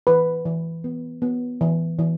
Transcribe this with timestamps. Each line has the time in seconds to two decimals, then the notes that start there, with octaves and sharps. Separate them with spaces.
0.07 E3 B4
0.45 E3
0.84 B3
1.22 B3
1.61 E3
1.99 E3